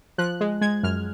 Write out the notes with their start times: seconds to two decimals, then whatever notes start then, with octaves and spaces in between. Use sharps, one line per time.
0.18 F3 F#6
0.41 G#3
0.61 G#3 G#6
0.83 F#2 F6